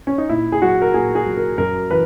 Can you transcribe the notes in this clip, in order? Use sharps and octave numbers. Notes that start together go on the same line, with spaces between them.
C#4
D#4
A#2 E4
G#4
F#3 F#4
A#4
A#2 G#4
G#4
F#3
A#4
F#2 A#4
E3 B4